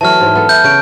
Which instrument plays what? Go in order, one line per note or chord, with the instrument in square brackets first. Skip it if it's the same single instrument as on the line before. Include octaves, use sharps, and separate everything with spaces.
[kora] E3 F#3 A3 [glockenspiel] A5 F6
[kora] G#2 E3
B3 A4
[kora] E4 [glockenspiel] G6
[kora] C#3 [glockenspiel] G6 D7